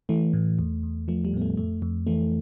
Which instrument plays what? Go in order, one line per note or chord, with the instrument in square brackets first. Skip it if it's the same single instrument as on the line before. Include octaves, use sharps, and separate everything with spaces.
[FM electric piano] E3 A3
A2
E2
E2
F3 A3
G3
A2 B3
A3
F2 A3
F2
E3 A3